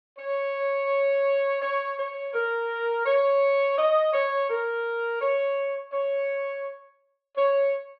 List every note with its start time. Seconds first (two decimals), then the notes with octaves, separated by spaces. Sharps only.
0.18 C#5
1.62 C#5
1.98 C#5
2.33 A#4
3.06 C#5
3.77 D#5
4.13 C#5
4.50 A#4
5.21 C#5
5.92 C#5
7.36 C#5